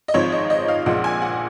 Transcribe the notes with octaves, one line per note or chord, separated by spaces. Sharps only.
D#5
G#1 G#2 F3 C4 D#4 C#5
D#5
D#5
F5
A#1 A#2 F3 G#3 F#5
G#5
F#5